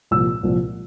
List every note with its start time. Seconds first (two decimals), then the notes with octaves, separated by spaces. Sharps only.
0.11 C2 A#2 F3 E6
0.43 C2 A#2 F3